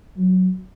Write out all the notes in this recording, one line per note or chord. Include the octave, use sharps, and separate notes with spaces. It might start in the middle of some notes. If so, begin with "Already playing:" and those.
F#3